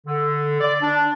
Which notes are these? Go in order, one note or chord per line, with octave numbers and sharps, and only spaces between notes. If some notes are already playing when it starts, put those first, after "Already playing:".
D3
D5
D4